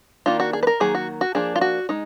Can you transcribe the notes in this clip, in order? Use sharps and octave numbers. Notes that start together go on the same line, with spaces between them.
D#3 A#3 D4 F4
F#4
G#4
B4
A#4
D#3 F#3 A#3 G#4
F#4
F#4
F3 A#3 D4 G#4
F4
F#4
G#3 D#4